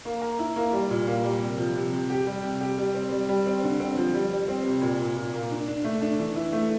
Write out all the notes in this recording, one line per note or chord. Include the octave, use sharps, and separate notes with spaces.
A#3
A#4
E4
A#3
G3
A#2
A#3
G3
C3
F3
C3
C3
G4
G3
C3
G4
G3
C4
G3
G3
C4
D3
C4
F3
G3
G3
C4
C3
A#2
A#2
A#2
A#3
D4
D4
A3
D4
E3
E4
A3